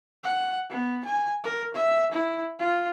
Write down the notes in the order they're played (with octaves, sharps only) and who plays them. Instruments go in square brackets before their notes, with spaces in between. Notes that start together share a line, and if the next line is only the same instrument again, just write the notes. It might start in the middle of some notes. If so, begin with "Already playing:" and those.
[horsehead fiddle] F#5
B3
G#5
A#4
E5
E4
F4